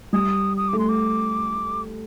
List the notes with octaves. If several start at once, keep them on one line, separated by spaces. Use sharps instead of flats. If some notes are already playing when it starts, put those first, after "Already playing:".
G3 D#6
D#6
A3 D6
C6
D6